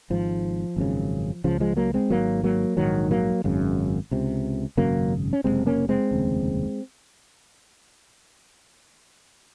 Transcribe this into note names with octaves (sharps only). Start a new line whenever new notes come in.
G#1 G#2 F3
G#1 F#2 C#3
C#2 C#3 F3
F3 G#3
F#3 A#3
G#3 C4
G#1 G#2 F#3 A#3
F#3 A#3
A#1 G#2 D#3 F#3
F#3 A#3
G#1 F#2 C#3
C#2 C3
G#1 F#2 C#3 F#3 A#3
C#4
F#1 F2 C3 G#3 C4
A#3 C#4
G#3 C4
F1 D#2 C#3